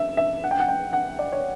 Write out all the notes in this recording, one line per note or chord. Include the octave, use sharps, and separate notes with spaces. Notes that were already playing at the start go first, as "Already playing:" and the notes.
Already playing: E5
E5
F#5
G5
F#5
G5
F#5
D5
C#5